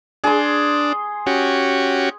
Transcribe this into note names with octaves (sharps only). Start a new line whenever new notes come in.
D4 G#4 C6
C#4 F#4 G4